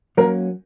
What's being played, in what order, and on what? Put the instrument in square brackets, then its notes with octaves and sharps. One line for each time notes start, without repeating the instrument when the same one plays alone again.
[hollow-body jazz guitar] F#3 A#3 C#4 [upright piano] A#4